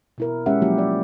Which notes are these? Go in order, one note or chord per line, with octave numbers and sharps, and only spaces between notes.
B2 E4 A#4
G#3 C#4 G4 E5 F#5
F3 F#3 A#3 E4 G4
D5